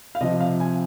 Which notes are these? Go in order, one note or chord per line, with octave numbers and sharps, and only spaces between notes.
F5
C3 F3 D#5
F5
G#5